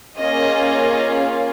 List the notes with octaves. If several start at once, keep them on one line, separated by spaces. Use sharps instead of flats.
A#3 C#4 F4 G#4 D#5